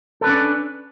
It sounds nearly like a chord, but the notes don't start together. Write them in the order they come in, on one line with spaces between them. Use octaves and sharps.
A4 B4 C#4 D4